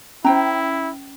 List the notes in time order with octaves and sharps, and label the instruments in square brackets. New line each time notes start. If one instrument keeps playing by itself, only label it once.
[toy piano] C#4 [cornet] E4 [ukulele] C5 G5 A#5